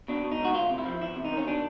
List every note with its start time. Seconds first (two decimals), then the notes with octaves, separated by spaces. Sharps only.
0.08 B2 D4
0.24 B2
0.32 D#4
0.40 C#2 F#4
0.55 D2 F4
0.70 C3
0.78 E4
0.86 F3
1.01 E2 E4
1.16 C3
1.24 D#4
1.32 D#3
1.37 C#4
1.47 B2 D4